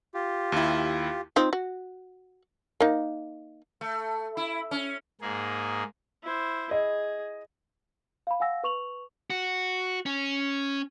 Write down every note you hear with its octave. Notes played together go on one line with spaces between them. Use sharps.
F4 G4
D#2 E4
C4 D#4 F4
F#4
A#3 D#4
A3
E4
C#4
G#2 A#3 G#4
E4 C5
G#4 D#5
F5 B5
F5 F#5 G#5 E6 A#6
B4 C#6 F7 F#7
F#4
C#4